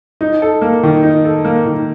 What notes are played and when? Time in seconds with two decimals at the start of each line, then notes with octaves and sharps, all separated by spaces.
0.21 D#4
0.42 A4
0.62 A#3
0.83 D#3
1.03 D#4
1.25 A4
1.45 A#3
1.66 D#3